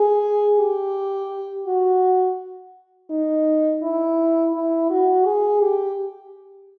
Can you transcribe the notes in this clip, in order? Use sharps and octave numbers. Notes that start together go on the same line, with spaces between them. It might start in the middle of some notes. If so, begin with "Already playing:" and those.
Already playing: G#4
G4
F#4
D#4
E4
E4
F#4
G#4
G4